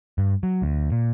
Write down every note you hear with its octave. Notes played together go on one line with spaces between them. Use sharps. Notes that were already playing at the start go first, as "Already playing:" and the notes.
G2
F#3
D2
A#2